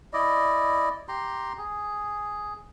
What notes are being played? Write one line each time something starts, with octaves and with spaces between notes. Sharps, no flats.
E4 D5 D#5
G4 A#5 C6
G#4